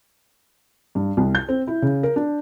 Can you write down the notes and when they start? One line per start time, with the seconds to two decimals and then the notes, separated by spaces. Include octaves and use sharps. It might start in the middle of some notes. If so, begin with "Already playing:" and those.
0.95 G2
1.17 C2
1.35 G6
1.49 C4
1.67 E4
1.82 C#3
2.03 A#4
2.16 D4